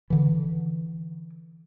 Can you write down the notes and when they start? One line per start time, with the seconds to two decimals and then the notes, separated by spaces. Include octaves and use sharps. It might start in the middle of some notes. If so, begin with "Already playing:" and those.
0.10 D3 E3